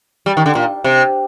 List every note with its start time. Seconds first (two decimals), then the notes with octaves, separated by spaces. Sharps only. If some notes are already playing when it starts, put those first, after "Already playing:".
0.26 G3
0.37 D#3
0.46 D3
0.55 A#2
0.84 C3